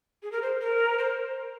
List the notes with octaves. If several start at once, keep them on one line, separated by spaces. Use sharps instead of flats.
G#4
A#4
C5
A#4
C5